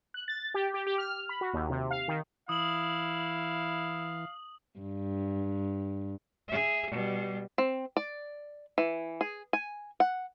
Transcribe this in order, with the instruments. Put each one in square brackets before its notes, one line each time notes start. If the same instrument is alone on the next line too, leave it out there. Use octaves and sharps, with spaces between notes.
[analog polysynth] F#6
A6
G4
G4
G4
F6
B5
F#4
D#2
C3
F5
D#3
[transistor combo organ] E3 [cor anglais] E4 [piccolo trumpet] F5 [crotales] D#6 F#7
[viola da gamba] G2
[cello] G#4 E5
B2 G3
[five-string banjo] C4
D5
E3
G#4
G#5
F#5